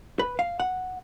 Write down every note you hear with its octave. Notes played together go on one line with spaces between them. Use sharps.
B4
F5
F#5